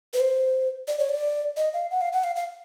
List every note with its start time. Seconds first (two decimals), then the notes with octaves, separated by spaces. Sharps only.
0.14 B4
0.20 C5
0.88 D5
0.99 C#5
1.09 D5
1.57 D#5
1.73 F5
1.91 F#5
2.01 F5
2.13 F#5
2.24 F5
2.36 F5